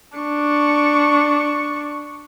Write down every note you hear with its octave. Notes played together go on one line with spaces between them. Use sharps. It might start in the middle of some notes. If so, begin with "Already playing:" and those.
D4 C#6